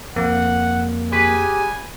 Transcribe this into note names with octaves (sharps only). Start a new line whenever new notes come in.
F2 A#3 F#5
G4 G#4 B4 G#5